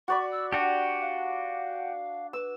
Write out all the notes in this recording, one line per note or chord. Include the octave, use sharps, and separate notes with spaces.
F#4 D5 B5 C#6
E6
D4 F#4 G4 F#5
F5
B4 E6